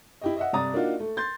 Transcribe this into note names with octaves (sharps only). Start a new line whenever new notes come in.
E4 G4 D#5
D#5 E5 F#5
G2 C3 D4 A#5 D#6 A6
A#3 D4 D#4 F4 F#4
A3
C6 G6 A6